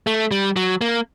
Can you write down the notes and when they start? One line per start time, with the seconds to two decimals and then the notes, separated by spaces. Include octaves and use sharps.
0.07 A3
0.31 G3
0.56 F#3
0.81 A#3